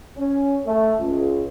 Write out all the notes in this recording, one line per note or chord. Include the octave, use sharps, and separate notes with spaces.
C#4
A3
C#2